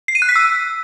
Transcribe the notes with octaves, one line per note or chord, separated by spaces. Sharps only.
C7
D#7
F#6
B6
E6